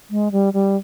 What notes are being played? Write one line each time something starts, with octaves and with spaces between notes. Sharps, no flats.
G#3
G3
G3